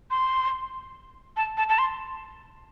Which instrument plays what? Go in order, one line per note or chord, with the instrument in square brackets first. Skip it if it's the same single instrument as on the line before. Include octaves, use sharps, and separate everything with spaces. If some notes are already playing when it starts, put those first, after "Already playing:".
[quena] C6
A5
A5
A5
C6